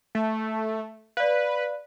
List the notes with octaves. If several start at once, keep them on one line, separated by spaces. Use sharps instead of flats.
A3
B4 D5 F5